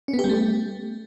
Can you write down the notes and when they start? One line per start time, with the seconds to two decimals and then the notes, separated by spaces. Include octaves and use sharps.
0.08 C#4
0.13 B3
0.19 G4
0.24 G3
0.29 A3